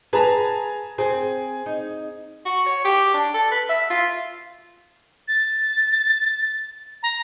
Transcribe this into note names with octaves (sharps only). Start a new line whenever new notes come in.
G#4 B4 A5 A#5
C4 G#4
D#4
F#4
C#5
G4
D4
A4
B4
E5
F4
A6
A#5